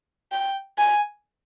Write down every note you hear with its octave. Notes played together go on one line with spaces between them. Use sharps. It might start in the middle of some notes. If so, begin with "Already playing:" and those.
G5
G#5